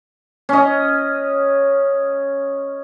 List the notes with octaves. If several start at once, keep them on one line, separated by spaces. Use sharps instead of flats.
C#4 D#5